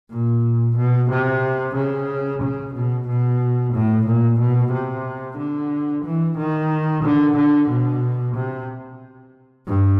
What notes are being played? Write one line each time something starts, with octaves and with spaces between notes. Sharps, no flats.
A#2
B2
C3
C#3
C#3
B2
B2
A2
A#2
B2
C3
D3
E3
D#3
D3
D3
B2
C3
G2